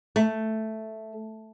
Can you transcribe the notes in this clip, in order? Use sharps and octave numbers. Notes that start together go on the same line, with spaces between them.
A3